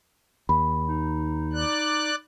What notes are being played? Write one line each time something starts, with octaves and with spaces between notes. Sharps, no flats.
D#2 B5
D#4
D5 F#6